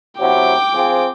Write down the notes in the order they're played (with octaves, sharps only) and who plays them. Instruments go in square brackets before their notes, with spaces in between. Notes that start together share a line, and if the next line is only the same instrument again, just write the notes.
[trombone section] C3 F#3 E4 [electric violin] G5 D6
[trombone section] F3 C4 G#4